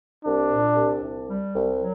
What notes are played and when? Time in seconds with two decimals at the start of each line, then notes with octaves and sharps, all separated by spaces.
0.24 C2 D4
0.49 A#2
0.75 C2
1.02 C2
1.27 G3
1.53 C2
1.79 F#3